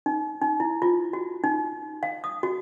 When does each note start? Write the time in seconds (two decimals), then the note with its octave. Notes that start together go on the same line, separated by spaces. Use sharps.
0.06 D#4
0.42 D#4
0.60 E4
0.82 F4
1.13 F#4
1.44 D#4
2.03 F5
2.24 D#6
2.43 F#4